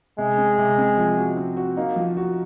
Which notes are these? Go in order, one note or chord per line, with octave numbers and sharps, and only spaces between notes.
C3 G#3
C4
C3
C4
F3
F#4
C4
F#4
A#3 D#4
F3
F#4